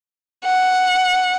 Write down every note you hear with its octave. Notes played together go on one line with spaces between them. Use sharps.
F#5